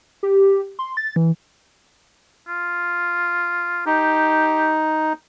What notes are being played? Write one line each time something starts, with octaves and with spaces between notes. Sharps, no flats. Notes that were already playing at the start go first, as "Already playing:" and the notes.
G4
C6
A6
E3
F4
D#4 G4